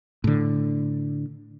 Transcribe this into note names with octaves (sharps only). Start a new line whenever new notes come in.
A2 D3